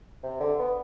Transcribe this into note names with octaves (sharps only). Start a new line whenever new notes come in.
C3
D3
B3